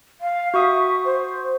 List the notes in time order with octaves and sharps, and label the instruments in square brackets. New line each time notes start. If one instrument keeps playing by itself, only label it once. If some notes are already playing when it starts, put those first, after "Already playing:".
[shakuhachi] F5
[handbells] F#4 C#6 D#6 [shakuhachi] E5
[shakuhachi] C5